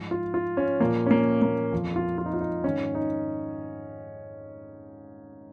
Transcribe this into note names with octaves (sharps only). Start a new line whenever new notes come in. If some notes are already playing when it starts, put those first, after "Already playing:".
Already playing: G#2 F3
F4
F4
C#4
A#2 F3 A#3
C#4
A#3
A#3
F2 F3
F4
F4
D#4
F4
D#4
G#2 D#3 C#4
D#4